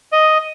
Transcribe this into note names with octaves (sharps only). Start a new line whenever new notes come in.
D#5